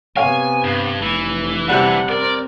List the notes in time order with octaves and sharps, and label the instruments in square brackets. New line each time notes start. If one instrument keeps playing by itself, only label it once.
[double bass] C3 B3 [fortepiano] C#5 F5 [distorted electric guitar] G#5
[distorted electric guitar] G2
[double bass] F1 [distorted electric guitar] E3
[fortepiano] C3 G3 [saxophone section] D4 F#5
[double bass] C4 [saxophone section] A#4 [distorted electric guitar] D5